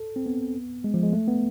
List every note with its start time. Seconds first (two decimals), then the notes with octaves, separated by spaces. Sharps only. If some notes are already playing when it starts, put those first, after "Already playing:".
Already playing: A4
0.16 C4
0.26 B3
0.84 G#3
0.94 F3
1.03 G#3
1.13 A3
1.28 B3